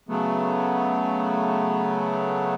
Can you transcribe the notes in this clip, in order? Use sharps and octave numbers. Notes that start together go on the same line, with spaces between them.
C#3 F#3 A3 B3